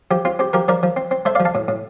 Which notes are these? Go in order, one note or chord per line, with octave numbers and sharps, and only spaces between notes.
F3 G4
C4 F4
C4 G4
F3 G4 A#4
F3 A#4 D5
F3
C4
C4
A3 C5 E5
D5 F5
F3
F5 A5
A2
A2